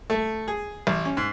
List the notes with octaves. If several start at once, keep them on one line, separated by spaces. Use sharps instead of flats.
A3
G#4
A1
C#4
G#2